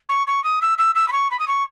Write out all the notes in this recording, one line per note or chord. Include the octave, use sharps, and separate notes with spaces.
C#6
C#6
D#6
E6
E6
E6
B5
C#6
B5
D#6
C#6